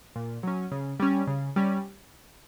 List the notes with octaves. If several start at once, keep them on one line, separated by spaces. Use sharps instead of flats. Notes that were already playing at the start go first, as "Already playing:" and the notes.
A#2
F#3 C#4
C#3
G3 C#4
C#3
G3 C#4